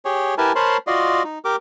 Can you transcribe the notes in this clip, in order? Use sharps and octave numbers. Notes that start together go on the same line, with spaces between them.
G4 G#4 C#5
E4 G4 A#4 B4 G#5 A5
A#4 C5 C#5 A5 B5 C6
F4 F#4 D5 D#5 C6
D#4
G4 A#4 D6